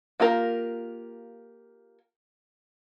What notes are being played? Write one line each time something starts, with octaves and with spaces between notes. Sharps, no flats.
A#3 F4 G4 A#4